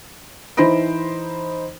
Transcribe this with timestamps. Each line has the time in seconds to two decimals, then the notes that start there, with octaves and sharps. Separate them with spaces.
0.57 E3 D#4 C5 B5 A#6 D7